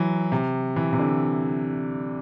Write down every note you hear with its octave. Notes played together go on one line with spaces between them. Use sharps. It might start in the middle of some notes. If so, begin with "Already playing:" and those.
Already playing: E3 F#3
C3
E3
C3
D3